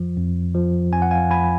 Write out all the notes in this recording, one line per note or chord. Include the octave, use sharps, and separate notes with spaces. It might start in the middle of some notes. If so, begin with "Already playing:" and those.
Already playing: F2 F3
F2
F3
F2 G#5
F#5
F5 G#5
F3 G#5 B5